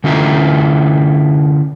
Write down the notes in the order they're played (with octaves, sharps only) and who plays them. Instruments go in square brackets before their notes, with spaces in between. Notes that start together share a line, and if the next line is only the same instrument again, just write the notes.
[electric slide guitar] D3 C#4 E4 F4 D#5 A#5